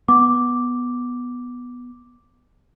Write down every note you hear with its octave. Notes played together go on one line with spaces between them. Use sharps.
B3 D6